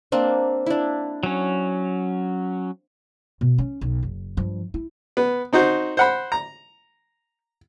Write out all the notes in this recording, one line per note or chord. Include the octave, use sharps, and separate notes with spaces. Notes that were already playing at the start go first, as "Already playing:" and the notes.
A#3 C4 D4
D4 E4
F#3 C#4
B2
C#4
B1
F#1
G2 F3
E4
B3
C4 D#4 F#4 C5
C5 F#5 B5
A#5